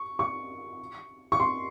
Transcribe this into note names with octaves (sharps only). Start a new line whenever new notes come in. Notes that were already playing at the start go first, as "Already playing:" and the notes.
Already playing: C#6
C#6
C#6
C6